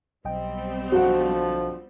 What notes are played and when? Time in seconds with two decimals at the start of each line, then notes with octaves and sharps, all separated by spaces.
0.25 B1 G3 B3 C4 D#5 G5
0.92 D3 F3 F#4 F#5